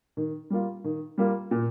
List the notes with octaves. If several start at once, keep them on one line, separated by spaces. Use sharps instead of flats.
D#3
G3 A#3 F4
D#3
G3 A#3 F4
A#2